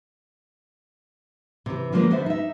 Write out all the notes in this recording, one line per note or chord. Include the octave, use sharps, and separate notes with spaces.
C3 E3
D3 F3 F#3 G#3 A#3 C#4
D3 B3 C5 E5
D#4 E5